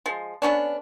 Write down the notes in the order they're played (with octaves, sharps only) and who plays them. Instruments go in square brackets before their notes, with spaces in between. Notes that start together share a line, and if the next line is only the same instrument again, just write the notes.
[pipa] F3 G#3
D3 B3 C#4 D4